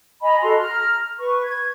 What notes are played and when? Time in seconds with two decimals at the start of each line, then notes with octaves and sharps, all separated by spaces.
0.21 D#5 G#5 A#5 B5
0.42 F#4 A4 A#5 C6
0.58 A#5 F6
1.19 B4 C#6
1.44 G#6